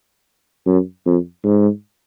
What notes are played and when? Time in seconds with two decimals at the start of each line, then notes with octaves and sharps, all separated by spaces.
0.67 F#2
1.06 F2
1.45 G#2